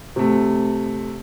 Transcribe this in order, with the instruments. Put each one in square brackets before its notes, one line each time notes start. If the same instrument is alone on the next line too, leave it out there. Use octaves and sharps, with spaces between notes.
[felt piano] C3 A3